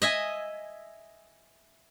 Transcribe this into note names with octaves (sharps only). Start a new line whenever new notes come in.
D#5 E5 G#5